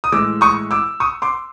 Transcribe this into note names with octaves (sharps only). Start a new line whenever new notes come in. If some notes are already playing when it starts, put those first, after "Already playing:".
D#6
A2 E3 G#3 D6 E6
C#6 D#6
D6 E6
C#6 D#6
C6 D6